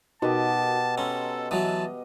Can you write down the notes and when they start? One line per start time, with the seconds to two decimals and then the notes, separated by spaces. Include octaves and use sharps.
0.22 B2 D#4 F#4 G4 A#4 D#5 A5
0.98 C#4 A4 A#5 C6 E6
1.51 E3 F#3 D#5 A5